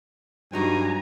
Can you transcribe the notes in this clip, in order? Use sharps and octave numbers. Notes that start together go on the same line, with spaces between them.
G2 F#3 D#4 F#4 G#5 A#5